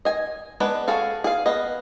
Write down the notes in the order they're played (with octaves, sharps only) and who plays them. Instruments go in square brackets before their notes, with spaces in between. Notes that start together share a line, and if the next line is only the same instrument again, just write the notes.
[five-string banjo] D#5 G#5
G#3 B3 D4 B4
F#4 G#4 A4 F5
G#4 F5
B3 D#5